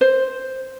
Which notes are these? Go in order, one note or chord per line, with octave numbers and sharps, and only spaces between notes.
C5